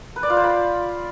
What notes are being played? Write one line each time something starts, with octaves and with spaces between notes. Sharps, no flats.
B4
D5
F4
C5
B5